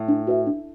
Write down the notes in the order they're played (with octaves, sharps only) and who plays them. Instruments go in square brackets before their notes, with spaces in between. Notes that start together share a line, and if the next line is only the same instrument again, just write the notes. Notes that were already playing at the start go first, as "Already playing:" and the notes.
Already playing: [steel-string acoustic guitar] A2
[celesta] D4
F#4 B4 E5
D4